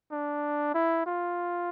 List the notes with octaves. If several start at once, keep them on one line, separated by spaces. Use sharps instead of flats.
D4
E4
F4